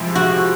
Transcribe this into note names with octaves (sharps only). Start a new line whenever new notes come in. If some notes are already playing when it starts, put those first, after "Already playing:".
Already playing: C3 F3 G#3 C4 E4
F#4